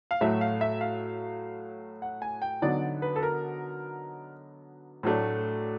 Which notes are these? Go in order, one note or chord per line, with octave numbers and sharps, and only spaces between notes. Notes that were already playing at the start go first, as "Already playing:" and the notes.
F5
A2 F#3 A3 E5
F5
E5
F5
F#5
G#5
G5
D3 F#3 B3 D#4 D5
B4
A4
A#4
A2 F#3 A3 D4